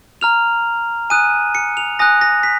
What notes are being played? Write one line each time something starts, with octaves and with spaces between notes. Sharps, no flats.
A#5 F6 F7
G#5 D#6 F#6 D#7
C#7
F7
G#5 D#6 F#6 A#6
A#6
B6